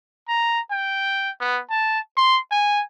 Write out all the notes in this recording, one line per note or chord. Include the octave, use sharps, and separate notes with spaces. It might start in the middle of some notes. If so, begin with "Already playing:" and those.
A#5
G5
B3
A5
C6
G#5